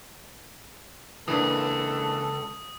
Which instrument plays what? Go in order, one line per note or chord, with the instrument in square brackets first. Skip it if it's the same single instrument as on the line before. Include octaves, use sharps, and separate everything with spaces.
[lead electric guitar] C#2 [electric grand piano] E3 A#3 D4 [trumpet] A4 [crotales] D#6